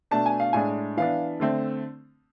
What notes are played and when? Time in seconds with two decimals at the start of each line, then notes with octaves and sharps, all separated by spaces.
0.11 B2 A3 D4 A5
0.26 G#5
0.40 F5
0.53 A2 G#3 D4 G#5
0.97 E3 B3 D4 F5
1.40 D3 A3 C4